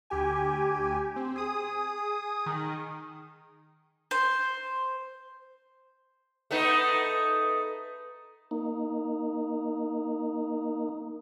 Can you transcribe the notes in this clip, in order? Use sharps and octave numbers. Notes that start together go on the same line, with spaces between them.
D2 G4 G#5
C4
G#4 D#6
D#3
C5
A3 B3 D#4
A#3 D#4